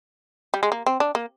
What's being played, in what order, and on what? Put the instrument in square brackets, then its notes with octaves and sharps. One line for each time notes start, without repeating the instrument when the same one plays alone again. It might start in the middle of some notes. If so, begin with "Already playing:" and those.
[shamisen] G3
G#3
A#3
C4
D4
A#3